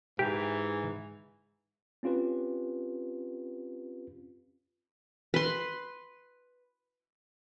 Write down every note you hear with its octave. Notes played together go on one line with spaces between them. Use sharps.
G#2 E3 G4
C4 C#4 F4 G4 B4
B4 C6